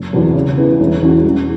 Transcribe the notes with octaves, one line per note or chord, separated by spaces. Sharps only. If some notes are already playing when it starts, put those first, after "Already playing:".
Already playing: F#1
E2 B2 F#3
C#3
E3 B3
E1
E2 E3 C#4 F#4
E1